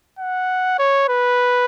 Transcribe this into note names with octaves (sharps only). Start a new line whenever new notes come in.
F#5
C#5
B4